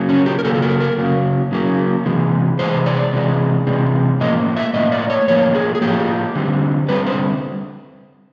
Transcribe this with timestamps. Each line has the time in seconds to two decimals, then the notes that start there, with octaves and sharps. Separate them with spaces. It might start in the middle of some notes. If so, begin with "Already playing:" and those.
Already playing: C#3 F#3 A#3
0.09 C#4
0.26 G4
0.39 A#4
0.44 C#3 F#3 A#3 A4
0.55 A4
0.62 A#4
0.80 A#4
0.98 C#3 F#3 A#3
1.52 C#3 F#3 A#3
2.05 C3 E3 G#3
2.59 C3 E3 G#3 C5
2.86 D5
3.13 C3 E3 G#3
3.67 C3 E3 G#3
4.20 A2 F3 A#3 D#5
4.57 E5
4.74 A2 F3 A#3 D#5
4.92 D5
5.10 C#5
5.28 A2 F3 A#3 C#5
5.55 G#4
5.75 G#4
5.81 A2 F3 A#3 G4
6.35 D3 G3 C4
6.89 D3 G3 C4 B4
7.07 C5